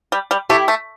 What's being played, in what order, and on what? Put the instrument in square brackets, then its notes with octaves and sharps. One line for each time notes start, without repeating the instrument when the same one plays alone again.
[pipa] G3
G3
[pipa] A3 [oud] E4 G4
[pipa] A3